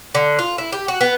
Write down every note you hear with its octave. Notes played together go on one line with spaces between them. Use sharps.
D3
F4
E4
G4
F#4
B3